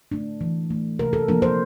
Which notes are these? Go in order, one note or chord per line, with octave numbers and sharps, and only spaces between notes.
A3 D4
E3
A3 D4
C3 A#4
A4
F3 A#3 D4 A#4
C5